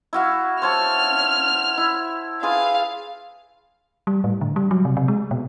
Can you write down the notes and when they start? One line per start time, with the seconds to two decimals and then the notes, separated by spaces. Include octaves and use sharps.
0.13 E4 F#4 F5
0.62 C5 C#5 A5 F6
1.78 E4
2.43 F4 G#4 B4 F5
4.07 G3
4.24 A2
4.41 D3
4.56 G3
4.71 F#3
4.85 C3
4.97 C3
5.08 G#3
5.31 B2